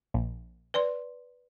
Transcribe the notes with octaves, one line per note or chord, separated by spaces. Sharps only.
A#1
B4 D5 C6